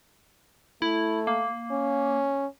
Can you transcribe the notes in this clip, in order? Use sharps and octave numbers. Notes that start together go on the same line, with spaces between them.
A3 E4
A#3
C#4